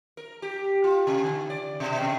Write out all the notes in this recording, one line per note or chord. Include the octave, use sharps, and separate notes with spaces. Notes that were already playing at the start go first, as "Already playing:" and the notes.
A#4
G4
F4
C3
D3
D5
B2
C3